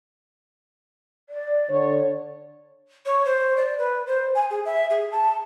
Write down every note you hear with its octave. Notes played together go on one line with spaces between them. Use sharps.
D5
D3 C#5
C#5
C5
D5
B4
C5
G#5
G#4
E5
G#4
A5